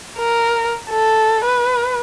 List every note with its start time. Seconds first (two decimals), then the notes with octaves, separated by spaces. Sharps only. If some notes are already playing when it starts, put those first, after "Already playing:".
0.19 A#4
0.90 A4
1.45 B4